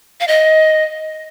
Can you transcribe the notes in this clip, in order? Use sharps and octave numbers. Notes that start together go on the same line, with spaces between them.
F5
D#5